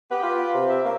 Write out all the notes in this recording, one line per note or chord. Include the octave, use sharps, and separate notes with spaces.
B3 G4 B4
F4
C3
G4 E5
A#3 C#4 D4